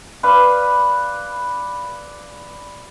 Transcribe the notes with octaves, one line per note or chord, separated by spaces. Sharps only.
B4 D5 F5 B5